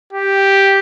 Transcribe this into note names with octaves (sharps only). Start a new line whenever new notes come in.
G4